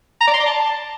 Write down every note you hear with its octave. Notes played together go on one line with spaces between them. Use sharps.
A#5
D5
C6
D5
A5